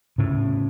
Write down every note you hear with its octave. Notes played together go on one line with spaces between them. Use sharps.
A2 C#3